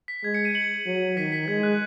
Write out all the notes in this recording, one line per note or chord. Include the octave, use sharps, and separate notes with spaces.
B6
G#3 G#6
G#6 C#7
B6 D#7
C#7 F#7
F#3
D#3 B6 D#7
B6
G#3 G#6
F#6